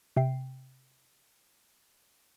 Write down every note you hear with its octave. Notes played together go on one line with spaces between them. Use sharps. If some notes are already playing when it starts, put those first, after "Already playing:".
C3 E5 G5 C7